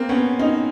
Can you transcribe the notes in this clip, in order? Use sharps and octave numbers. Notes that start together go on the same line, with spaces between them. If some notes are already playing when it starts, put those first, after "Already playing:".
Already playing: A#3 C4
B3 C#4
C#4 D#4